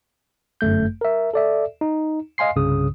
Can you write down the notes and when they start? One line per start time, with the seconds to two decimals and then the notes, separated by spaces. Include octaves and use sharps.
0.61 G1 F#2 A3 G6
1.01 A#4 E5
1.34 A4 D5 E5
1.81 D#4
2.38 D#5 F5 G#5 C6 C7
2.56 C2 G2 C#3 D#6